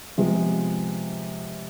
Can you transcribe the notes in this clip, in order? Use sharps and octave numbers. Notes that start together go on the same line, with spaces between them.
C3 F3 G#3 B3